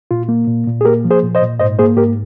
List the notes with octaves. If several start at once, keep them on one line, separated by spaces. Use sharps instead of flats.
A#2 F4
A#3
A#2
A#2
G#4
A#3 G4 A#4
F3
G#4 C5
A#2
C5 D#5
A#2
G#2 C5 D#5
A#3 G#4 C5
G#2 G4 A#4